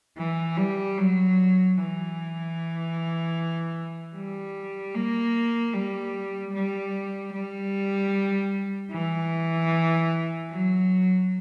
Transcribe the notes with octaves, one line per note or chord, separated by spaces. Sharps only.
E3
G3
F#3
E3
G3
A#3
G3
G3
G3
E3
F#3